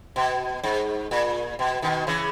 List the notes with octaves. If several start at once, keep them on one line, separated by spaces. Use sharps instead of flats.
B2
G#2
A#2
B2
B2 D#3
C#3 E3